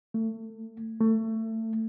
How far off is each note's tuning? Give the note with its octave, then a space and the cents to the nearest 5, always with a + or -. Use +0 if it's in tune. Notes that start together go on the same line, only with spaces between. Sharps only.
A3 +30
A3 +25